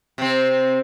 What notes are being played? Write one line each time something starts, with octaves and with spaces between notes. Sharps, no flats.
C3 C4